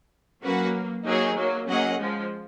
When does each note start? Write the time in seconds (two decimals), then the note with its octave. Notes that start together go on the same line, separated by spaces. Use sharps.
0.43 F#3 A#3 C#4 F#4 B4 F#5
1.06 F#3 A#3 D#4 G#4 C#5 G#5
1.37 F#3 A#3
1.69 F#3 A#3 C#4 G#4 D#5 F#5
2.00 F3 G#3